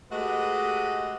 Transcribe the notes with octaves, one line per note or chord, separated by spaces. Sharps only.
G#3 A3 F#4 G4 B4 D#5